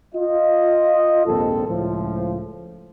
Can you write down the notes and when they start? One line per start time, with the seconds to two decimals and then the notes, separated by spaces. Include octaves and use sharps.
0.15 F4 D#5
1.26 A#1 D#2 G#2 C4 A4
1.67 C#2 A2 F3